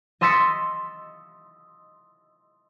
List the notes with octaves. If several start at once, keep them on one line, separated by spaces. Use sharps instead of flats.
D#5 C6 E6 A6 B6 C#7